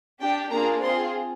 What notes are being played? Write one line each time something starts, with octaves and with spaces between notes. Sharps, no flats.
D4 G4 G5
A#3 D4 F4 G#4 A#5
C4 F4 G#4 C6